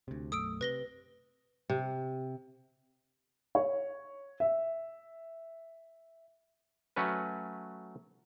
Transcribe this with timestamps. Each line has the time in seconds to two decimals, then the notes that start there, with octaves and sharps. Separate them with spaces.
0.08 D2 C3
0.32 B1 F#2 A3 D#6 E6 D7
0.61 C3 B4 A#6 G7
1.70 C3
3.55 C#5
4.40 E5
6.96 F#3 A3 C#4 B4